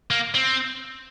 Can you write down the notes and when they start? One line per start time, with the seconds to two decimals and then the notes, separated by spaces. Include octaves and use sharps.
0.11 A#3
0.34 C4